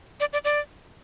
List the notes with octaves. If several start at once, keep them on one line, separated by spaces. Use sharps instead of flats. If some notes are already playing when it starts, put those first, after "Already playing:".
D5
D5
D5